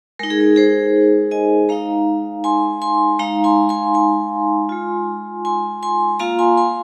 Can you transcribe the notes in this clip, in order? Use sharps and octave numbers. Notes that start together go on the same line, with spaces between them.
G#3 D#4 A#4
G#4
A#4
G#4 C5
D#5 G#5
G#3 D#4 F5 A#5
G#5 C6
G#5 C6
G#3 D#4 F5 A#5
G#5 C6
G#5 C6
G#5 C6
G#3 F4
G#5 C6
G#5 C6
A#3 F4 F5 A#5
G#5 C6
G#5 C6